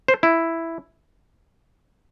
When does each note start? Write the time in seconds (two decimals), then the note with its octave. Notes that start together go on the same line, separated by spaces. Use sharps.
0.08 C5
0.23 E4